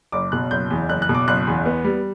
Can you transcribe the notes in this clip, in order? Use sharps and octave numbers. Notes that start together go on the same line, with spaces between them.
F#1 D6
B2 F#6
F#1 G6
E2
F#1 F#6
F#6
B2
D6
F#1 F#6
E2
B3
G3